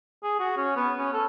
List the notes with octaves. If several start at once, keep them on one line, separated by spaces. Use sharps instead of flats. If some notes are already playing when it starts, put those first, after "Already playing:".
G#4
F#4
C#4
B3
C#4
A4